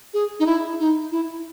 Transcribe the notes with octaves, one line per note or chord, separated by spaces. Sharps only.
G#4
D#4
E4
D#4
E4